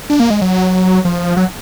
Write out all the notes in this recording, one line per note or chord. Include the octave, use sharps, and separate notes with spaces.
D4
A#3
G#3
F#3
F3
F#3